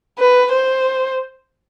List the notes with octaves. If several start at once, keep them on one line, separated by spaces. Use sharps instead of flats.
B4
C5